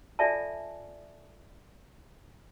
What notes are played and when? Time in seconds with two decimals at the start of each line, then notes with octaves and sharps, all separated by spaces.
0.19 F4 A4 D5 E5 G#5 A5